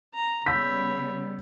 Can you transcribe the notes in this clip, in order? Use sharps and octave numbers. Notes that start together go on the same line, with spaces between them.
A#5
C#3 G3 B3 C#5 B5 E6 G6 B6